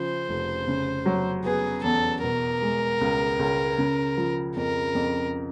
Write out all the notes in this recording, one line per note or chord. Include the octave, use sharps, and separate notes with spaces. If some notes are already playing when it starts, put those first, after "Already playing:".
Already playing: C#3 F3 C5
F1
C#3
F#3
B3 G#4
E2 A4
B2 A#4
G#3
C#2
C#2
C#3
F3
F2 A#4
F2